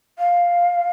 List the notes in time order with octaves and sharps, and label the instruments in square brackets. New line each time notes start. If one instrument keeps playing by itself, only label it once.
[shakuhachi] F5